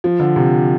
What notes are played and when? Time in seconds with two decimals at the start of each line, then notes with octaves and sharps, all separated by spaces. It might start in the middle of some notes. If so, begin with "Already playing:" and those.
0.04 F3
0.20 D3
0.36 C3